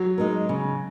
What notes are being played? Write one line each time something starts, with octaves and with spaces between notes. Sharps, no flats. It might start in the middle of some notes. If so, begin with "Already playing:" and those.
Already playing: F#3
G#3 D#4 A#4
C#3